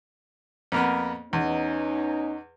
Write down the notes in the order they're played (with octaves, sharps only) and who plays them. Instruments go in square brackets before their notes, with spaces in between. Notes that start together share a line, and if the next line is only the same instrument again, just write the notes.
[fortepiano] F2 A#3 B3
[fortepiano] E2 [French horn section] B3 C#4 D#4